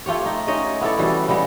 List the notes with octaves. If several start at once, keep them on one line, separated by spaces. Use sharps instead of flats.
A3 F4 G4 C#5
D#4
C#4 D#4 C#5 D#5
B3 E4 A4 D5
B2 E3 G3 C#4
C#3 G3 G#3 B3